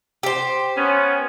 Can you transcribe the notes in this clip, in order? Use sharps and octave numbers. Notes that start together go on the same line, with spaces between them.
G4 C5
B3 C#4